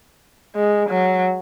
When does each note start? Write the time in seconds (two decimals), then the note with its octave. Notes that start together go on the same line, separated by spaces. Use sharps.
0.56 G#3
0.89 F#3